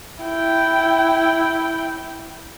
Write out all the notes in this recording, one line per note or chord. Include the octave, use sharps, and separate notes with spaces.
E4 G5